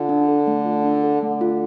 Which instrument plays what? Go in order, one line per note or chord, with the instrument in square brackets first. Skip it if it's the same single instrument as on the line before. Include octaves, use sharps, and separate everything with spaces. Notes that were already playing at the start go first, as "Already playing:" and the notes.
Already playing: [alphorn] D3 [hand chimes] F4
[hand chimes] D4
A4
A3
F4
D4
A4
[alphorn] D3 [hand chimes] A3
[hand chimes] F4